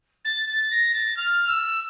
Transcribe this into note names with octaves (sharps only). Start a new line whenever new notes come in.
A6
A6
A#6
A6
F6
E6